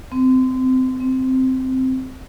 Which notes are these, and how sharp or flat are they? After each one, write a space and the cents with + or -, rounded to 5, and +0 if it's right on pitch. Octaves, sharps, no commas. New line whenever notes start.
C4 -25
C4 -10